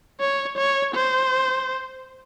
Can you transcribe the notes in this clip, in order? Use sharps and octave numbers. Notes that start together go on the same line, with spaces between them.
C#5
C#5
C5